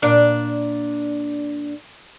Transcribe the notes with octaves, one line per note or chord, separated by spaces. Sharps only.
A#2 D4 D5